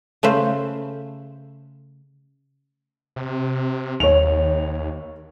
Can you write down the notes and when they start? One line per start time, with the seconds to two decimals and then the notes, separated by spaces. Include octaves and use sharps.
0.23 C#3 A3 B4 C5
3.16 C3
4.00 D#2 C#5 F7